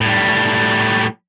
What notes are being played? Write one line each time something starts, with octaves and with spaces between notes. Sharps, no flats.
A2 G3